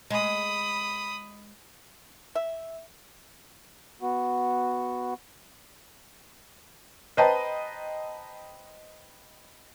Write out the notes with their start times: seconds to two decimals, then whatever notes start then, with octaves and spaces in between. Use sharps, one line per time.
0.10 G#3 B5 D#6
2.35 E5
4.02 B3 F#4
7.17 B4 C5 D#5 G5 A5 A#5